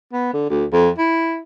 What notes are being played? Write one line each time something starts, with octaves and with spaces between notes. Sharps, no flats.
B3
D3
D2
F2
E4